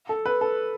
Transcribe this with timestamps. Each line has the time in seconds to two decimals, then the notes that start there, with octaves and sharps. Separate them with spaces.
0.09 A4
0.26 B4
0.41 A4